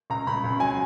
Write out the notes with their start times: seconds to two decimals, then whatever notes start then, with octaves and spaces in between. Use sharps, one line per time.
0.10 C#2 A#5
0.27 C#2 B5
0.44 C#2
0.60 F#3 G#5